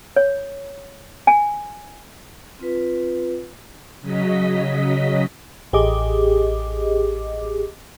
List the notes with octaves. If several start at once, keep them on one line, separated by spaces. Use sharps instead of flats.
C#5
G#5
C4 F4 B4
C#3 F#3 D#5 B6
A1 G4 G#4 D#5 D6